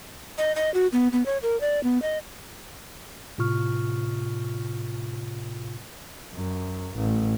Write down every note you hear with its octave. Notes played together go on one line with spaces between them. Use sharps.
D#5
D#5
F#4
B3
B3
C#5
A#4
D5
B3
D#5
A2 C3 F4 C#6 F6
F#2
A1